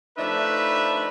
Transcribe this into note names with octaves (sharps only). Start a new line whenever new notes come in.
F3 A3 D4 D#4 B4 E5